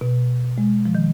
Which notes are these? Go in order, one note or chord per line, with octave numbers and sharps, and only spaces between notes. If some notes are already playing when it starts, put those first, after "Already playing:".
B2
G#3
F3
D#3